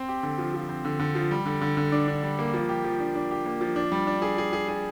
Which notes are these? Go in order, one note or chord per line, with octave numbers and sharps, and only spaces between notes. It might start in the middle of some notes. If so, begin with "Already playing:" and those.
Already playing: C4
G4
D3
F3
F3
C4
D3
D3
F3
G3
D3
D3
D3
D4
D4
G3
A#3
F3
G4
F3
D4
D4
G4
A#3
F3
D4
G3
D4
G#4
G#4
G#4
G#4